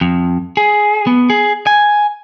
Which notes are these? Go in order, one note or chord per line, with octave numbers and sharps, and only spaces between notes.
F2
G#4
B3
G#4
G#5